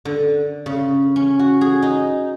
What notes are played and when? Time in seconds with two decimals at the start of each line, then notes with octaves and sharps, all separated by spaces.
0.05 D3
0.66 C#3
1.16 C#4
1.39 F#4
1.61 G#4
1.82 D#4